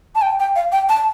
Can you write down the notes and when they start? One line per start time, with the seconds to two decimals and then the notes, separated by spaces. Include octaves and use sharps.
0.15 A5
0.22 G5
0.40 G5
0.56 F5
0.72 G5
0.89 A5